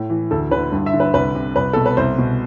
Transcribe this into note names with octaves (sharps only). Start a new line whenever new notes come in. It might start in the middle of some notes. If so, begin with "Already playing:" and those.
Already playing: A2
E3
D2 A4
D3 B4
G2
E5
D3
B4
C2 B4
C3
C2 B4
B2 A4
B4
C2 C5
B2